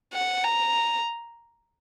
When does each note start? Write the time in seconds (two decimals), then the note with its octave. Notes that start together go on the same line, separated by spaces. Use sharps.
0.13 F#5
0.43 A#5